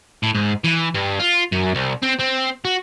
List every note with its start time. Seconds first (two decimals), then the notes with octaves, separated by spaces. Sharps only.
0.23 A2
0.35 G#2
0.64 E3
0.95 G2
1.20 F4
1.52 F#2
1.75 C2
2.03 C4
2.19 C4
2.65 F#4